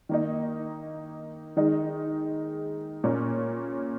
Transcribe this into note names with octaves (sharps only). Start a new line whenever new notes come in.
D#3 A#3 D#4
D#3 G#3 D#4
A#2 A#3 C#4